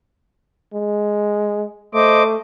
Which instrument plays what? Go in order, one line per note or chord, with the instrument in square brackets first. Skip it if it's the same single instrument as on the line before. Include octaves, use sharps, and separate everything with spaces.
[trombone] G#3
[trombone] A3 [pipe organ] C5 D#5 D6